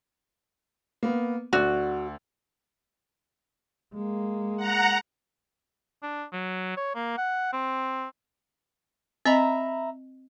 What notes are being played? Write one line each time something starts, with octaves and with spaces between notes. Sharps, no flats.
A#3 B3
D2 F#4 D5 E6
G#3 A#3
F#5 A#5
D4
F#3
C#5
A#3
F#5
C4
C4 D#5 E5 A#5 B5